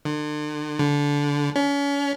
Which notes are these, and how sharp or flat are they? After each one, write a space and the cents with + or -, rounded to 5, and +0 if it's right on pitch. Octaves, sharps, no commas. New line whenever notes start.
D3 +40
D3 -20
C#4 +35